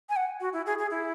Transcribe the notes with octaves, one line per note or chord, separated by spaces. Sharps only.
G#5
F#5
F#4
E4
G#4
G#4
E4